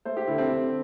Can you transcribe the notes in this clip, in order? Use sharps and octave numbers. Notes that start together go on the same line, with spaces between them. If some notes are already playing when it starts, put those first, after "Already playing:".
A3 C5
G4
D3 E4
C4
D3